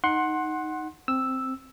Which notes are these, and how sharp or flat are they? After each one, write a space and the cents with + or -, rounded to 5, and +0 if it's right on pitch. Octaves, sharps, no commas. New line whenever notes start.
D#4 +0 F#5 +0 C6 +20
C4 +0 E6 +0